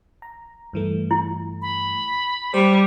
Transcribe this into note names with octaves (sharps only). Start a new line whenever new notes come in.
A#5
G2 E3 A3
E4
B5
G3 C5